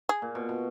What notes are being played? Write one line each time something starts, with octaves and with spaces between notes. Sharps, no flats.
G#4
A#2
B2
B2